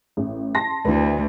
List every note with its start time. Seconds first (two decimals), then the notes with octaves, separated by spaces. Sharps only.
0.17 A1
0.55 A5 C6 A#6
0.85 D2 E4 B4